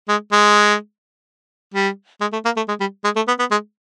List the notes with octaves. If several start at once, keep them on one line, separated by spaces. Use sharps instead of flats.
G#3
G#3
G3
G#3
A3
A#3
A3
G#3
G3
G#3
A3
B3
B3
G#3